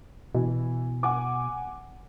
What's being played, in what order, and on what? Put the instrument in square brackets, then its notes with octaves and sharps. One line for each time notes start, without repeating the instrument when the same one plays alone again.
[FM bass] B2 [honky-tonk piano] E3
[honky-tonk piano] F#5 G#5 D6